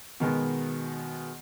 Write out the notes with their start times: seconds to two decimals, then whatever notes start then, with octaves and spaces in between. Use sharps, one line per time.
0.20 B2 D#3 G#3 B3